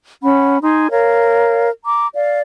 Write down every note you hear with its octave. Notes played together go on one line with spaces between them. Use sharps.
C#4 F#5 B5
D#4 G#5 C6
A#4 C#5 F5
A#5 D6
D5 F5